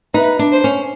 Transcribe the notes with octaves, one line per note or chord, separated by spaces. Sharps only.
D#4 B4
D4
C5
C#4